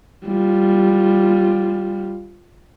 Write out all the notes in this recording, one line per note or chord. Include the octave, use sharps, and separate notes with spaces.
G3 F4